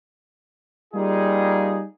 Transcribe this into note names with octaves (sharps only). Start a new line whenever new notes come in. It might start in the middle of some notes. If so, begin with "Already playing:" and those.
G3 A#3 D#4 F4 G#4